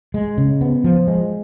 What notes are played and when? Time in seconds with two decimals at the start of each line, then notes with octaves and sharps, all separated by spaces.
0.14 G#3
0.38 C#3
0.61 B3
0.84 F3
1.07 G#3